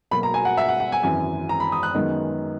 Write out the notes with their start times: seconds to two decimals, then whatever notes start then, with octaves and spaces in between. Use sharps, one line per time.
0.11 B1 B2 F#3 A#3 B5
0.23 A#5
0.34 G#5
0.45 F#5
0.57 E5
0.68 F#5
0.80 F#5
0.92 G#5
1.03 G#1 F#2 E3 G#5
1.49 A#5
1.60 B5
1.72 D#6
1.83 F#6
1.94 F#2 D#3 G#3 B3 D#4